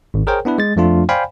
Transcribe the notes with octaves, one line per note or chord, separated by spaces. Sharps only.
G#1
G#4 A#4 C5 C#5 G5
B3 D4 E4 B4
G#3 A6
F2 F3 A3 D4 F4
C5 D5 F5 G5 G#5 B5